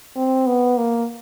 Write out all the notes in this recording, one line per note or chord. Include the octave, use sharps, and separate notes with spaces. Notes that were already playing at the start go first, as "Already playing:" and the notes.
C4
B3
A#3